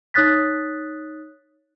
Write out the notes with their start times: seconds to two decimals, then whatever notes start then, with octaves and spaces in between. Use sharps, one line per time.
0.14 D#4 C#5 D#6 F#6 A6 B6